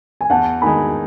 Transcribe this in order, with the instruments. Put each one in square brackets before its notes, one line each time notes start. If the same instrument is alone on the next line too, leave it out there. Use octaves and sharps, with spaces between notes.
[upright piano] G#5
[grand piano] E2 [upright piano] F#5 A5
[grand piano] D#3 G#3 [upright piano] G#5 B5